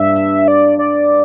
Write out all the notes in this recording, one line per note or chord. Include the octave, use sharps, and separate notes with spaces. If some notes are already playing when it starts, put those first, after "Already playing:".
Already playing: G2 E5
D5
D5